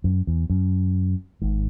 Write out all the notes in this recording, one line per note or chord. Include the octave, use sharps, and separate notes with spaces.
F#2
E2
F#2
G#1 G#2